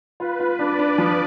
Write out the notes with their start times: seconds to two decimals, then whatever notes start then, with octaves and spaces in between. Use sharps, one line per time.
0.20 F4 B4
0.40 F4
0.59 D4 D5
0.79 D4
0.98 F3